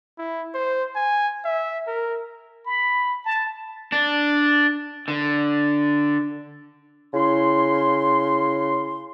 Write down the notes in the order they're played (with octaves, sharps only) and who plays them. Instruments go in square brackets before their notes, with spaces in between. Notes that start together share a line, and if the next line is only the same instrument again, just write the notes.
[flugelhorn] E4
C5
G#5
E5
A#4
[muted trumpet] B5
A5
[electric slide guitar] D4
D3
[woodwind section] C#3 E4 C6